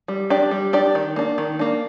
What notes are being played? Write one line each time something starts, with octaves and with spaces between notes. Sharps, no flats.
G3
D4 G4 D5
G3
D4 G4 D5
D#3
A#3 D4
D#3
A#3 D4